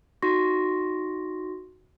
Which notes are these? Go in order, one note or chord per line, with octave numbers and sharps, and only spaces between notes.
D#4 F#4 C6 C#6 A#6